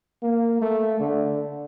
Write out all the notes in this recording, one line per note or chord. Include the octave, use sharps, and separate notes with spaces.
A#3
A3
D3